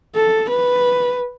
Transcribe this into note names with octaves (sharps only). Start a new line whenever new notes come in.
A4
B4